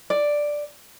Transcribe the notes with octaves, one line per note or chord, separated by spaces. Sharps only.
D5